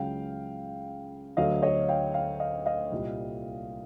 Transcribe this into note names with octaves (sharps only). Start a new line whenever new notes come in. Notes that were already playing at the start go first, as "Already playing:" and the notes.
Already playing: C#2 C#3 F#3 F5 G5
D2 D3 F#3 D#5 F5
C#5 D#5
F5 G5
F5 G5
D#5 F5
D#5 F5
C2 A#2 G3